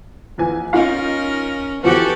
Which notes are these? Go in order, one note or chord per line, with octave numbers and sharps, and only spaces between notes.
A#1 E3 G#5
C#4 D#4 F4 A#4 F5
E3 F3 B3 F#4 G4 A4